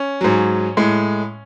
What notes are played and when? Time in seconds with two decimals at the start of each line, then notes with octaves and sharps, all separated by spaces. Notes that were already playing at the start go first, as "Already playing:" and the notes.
Already playing: C#4
0.21 G#2 F#3
0.77 A2 G#3